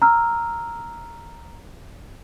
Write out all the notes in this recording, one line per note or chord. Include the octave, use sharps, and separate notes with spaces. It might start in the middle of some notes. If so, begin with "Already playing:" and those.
A#5 E6 F6